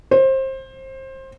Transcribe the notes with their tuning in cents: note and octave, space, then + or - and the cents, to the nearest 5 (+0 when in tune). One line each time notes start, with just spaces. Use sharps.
C5 +25